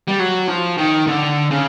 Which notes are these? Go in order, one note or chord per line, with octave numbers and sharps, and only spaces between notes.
G3
F#3
F3
D#3
D3
C#3